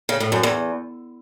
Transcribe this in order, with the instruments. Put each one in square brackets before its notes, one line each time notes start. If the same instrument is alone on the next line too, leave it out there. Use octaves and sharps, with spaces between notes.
[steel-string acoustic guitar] C#3
A2
F#2
E2